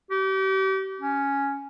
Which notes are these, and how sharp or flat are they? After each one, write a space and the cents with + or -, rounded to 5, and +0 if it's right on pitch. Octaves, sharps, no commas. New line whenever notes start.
G4 -35
C#4 +5